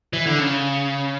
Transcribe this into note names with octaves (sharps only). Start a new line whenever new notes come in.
E3
D3
C#3